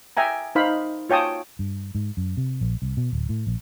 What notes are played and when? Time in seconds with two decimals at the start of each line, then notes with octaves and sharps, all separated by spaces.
0.17 E5 G5 G#5 A#5
0.55 D#4 C5 F5 B5
1.10 F4 C#5 G5 A5 D#6
1.59 G2
1.95 G#2
2.17 F#2
2.37 C3
2.61 A#1
2.82 C2
2.97 B2
3.13 D1
3.29 A2
3.47 A#1